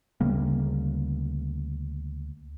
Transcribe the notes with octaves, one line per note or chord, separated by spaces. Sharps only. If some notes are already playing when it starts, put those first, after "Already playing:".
D2 C#3 G3 A#3